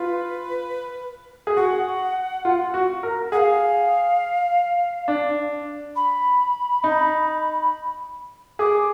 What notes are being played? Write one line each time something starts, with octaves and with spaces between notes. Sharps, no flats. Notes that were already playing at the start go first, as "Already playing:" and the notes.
Already playing: F4 B4
G#4
F#4 F#5
F4
F#4
A#4
G#4 F5 F#5
D4
B5
D#4
G#4 D6